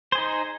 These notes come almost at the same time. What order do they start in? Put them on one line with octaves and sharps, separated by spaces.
C5 G#4 D#4